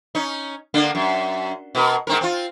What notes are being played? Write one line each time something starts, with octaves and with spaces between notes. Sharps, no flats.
C#4 D#4
D3 A#3 D4
F#2
B2 A#4
G#2 C4 A#4
C4 F4